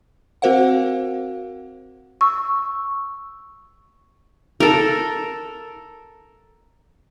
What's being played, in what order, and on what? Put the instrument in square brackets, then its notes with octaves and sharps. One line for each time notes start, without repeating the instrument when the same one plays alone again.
[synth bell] C4 F#4 A#4 C5 F5 F#5
[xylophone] C#6 E6
[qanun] A4 A#4